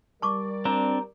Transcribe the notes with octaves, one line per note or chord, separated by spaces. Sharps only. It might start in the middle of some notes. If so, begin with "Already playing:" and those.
G3 A#4 D5 A5 C#6 D6
C4 D4 A#5